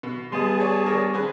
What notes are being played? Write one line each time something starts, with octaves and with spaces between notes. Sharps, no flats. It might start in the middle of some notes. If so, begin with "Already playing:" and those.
B2
G3 B3 G#4 D#5 A5 C6
C#5 D5
D4 A#4 C#5
C4 G#4 B4